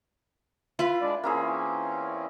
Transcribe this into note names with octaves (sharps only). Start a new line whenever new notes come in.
E4 F4 B4 B5
G#3 D4 D5
E2 A#3 C4 C#4 E4 G#4